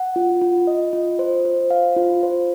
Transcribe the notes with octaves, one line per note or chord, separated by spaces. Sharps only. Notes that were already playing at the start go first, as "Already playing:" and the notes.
Already playing: F#5
F4
F4
D#5
F4
C5
C5
F5
F4
C5